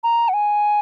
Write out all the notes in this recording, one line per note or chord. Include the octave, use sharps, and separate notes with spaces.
A#5
F#5
G#5